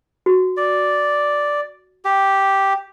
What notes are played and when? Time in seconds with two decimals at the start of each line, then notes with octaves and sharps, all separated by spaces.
0.26 F#4
0.57 D5
2.05 G4